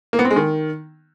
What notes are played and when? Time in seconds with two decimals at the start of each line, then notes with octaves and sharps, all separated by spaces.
0.13 A#3
0.19 B3
0.25 C4
0.30 G#3
0.36 D#3